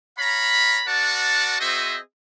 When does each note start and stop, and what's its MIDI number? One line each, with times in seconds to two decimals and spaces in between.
0.18 0.81 73
0.18 0.81 77
0.18 0.81 82
0.18 0.81 83
0.86 1.58 66
0.86 1.58 70
0.86 1.58 74
0.86 1.58 78
0.86 1.58 81
1.60 1.99 60
1.60 1.99 66
1.60 1.99 68
1.60 1.99 72
1.60 1.99 75
1.60 1.99 76